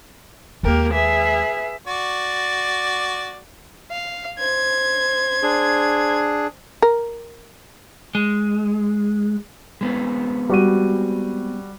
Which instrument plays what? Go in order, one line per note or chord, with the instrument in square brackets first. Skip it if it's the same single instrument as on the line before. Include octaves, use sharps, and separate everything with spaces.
[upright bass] D#2 G#3 [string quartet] A#3 G4 A#4
[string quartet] G#4 B4 E5
[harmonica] F#4 D5
[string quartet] F5
C5 G#6
[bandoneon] D4 G#4
[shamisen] A#4
[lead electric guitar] G#3
[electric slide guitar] G#3 B3 C4
[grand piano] G3 F#4 D#7